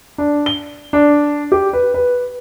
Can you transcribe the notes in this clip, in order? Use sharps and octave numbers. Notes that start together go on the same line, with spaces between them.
D4
G7
D4
G4
B4
B4